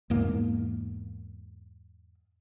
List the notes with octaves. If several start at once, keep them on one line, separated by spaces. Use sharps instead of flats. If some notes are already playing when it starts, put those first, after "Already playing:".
E2 G#2 A#3